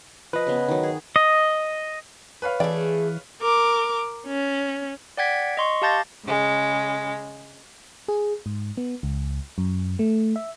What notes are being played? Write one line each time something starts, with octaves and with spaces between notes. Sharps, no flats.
F3 B4 D#5
C#3 B3
D#3 F#3
G#4
D#5
B4 C#5 F5
E3 A3 G#4 D5
A#4 D6
C#4
D5 F#5 G5 G#6 B6
D#5 C6 C#6
G4 F5 A5 G6 A6 A#6
C#3 G#3
G#4
G#2
B3
C#2
F#2
A3
E5